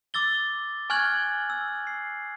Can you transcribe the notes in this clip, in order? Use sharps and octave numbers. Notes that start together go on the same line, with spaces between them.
D6 E6 A6 G7
G#5 C#6 F6 F#6 G#6 F#7
E6
C7